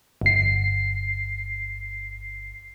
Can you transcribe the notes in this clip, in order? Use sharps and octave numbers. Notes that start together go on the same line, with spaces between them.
G1 C7